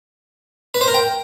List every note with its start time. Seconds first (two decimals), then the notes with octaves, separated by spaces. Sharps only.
0.74 B4
0.81 C5
0.88 A#4
0.94 G5